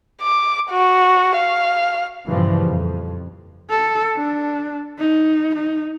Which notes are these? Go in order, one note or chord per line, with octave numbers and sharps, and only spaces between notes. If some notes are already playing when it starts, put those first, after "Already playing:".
D6
F#4
F5
G2 A#2 C#3 E3 F3 G3
F2
A4
D4
D#4
D#4